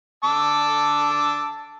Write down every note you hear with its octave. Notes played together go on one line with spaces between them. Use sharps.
A5 D6 E6